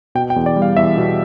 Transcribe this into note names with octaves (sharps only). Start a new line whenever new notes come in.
B2 G5
G5
E2
D5
G3
F5
E2 E5
B2